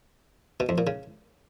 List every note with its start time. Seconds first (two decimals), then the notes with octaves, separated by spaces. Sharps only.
0.60 B2
0.69 F2
0.78 A#2
0.87 C#3